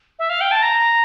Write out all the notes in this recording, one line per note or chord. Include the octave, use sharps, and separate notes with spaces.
E5
F5
G5
A5
A#5